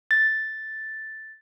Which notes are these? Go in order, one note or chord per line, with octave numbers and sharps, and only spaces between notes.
A6